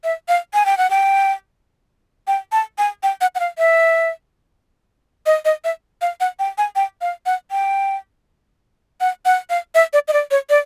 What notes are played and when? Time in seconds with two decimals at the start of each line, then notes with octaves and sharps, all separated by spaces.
0.04 E5
0.28 F5
0.54 G#5
0.66 G5
0.77 F#5
0.90 G5
2.27 G5
2.52 A5
2.78 G#5
3.03 G5
3.21 F#5
3.35 F#5
3.40 F5
3.58 E5
5.26 D#5
5.45 D#5
5.64 E5
6.02 F5
6.20 F#5
6.39 G5
6.58 G#5
6.76 G5
7.01 F5
7.26 F#5
7.51 G5
9.01 F#5
9.25 F#5
9.50 F5
9.75 E5
9.93 D5
10.08 D#5
10.13 D5
10.31 C#5
10.50 D5